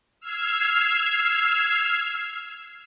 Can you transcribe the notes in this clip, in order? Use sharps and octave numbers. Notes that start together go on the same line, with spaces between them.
E6 F6 G#6 C7